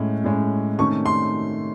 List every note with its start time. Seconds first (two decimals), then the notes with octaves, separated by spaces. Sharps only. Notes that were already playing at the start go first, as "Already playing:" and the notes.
Already playing: A2 G#3 C#4
0.24 A2 G#3 C#4
0.79 C3 D#3 A3 C#4 C#6
1.06 C6